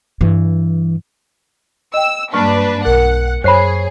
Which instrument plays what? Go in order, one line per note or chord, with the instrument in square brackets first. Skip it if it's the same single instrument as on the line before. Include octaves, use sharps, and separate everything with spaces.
[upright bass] G2 E3
[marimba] D#5 G5 [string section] E6
[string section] G2 D4 B4 [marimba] A#3 F6 [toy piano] C#6
[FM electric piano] B1 F#6 [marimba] A#4 [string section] F#5
[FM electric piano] F#2 C#5 C7 [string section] G#4 [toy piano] C5 B5